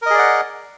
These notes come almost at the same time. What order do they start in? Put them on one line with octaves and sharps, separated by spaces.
A#4 D#5 G#4 D5 F#5